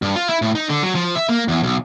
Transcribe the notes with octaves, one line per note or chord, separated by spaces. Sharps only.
G2
F4
E4
A2
D#4
D3
F#3
F3
E5
A#3
E2
B1